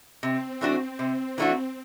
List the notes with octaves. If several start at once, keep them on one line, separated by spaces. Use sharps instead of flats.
C3 C4
E3 A3 D4 F#4
C3
E3 A3 D4 F#4